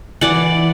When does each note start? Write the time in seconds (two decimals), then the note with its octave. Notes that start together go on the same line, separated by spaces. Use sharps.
0.21 E3 D5 F#5